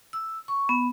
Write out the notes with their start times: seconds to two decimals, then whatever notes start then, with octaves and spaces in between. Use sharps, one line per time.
0.13 E6
0.48 C#6
0.69 B3